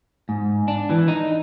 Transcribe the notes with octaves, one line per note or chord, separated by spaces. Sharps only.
G#2
D4
E3
D#4